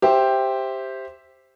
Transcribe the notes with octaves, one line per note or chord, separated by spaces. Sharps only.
G4 C5 E5 G5